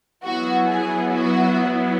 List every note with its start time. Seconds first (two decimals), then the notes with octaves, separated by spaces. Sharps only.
0.24 F#3 B3 E4 F#4
0.67 G#4
1.09 F#4